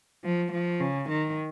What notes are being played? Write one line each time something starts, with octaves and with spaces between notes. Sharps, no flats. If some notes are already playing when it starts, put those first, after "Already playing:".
F3
F3
C#3
D#3